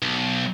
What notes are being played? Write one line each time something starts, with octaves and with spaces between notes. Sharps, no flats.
B1